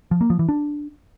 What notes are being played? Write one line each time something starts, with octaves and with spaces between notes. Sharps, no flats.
F3
A#3
F3
E3
D4